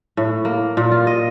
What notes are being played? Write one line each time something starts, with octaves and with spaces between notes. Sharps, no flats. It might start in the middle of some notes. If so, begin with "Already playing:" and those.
A2
A#3
A#2
F4
D#5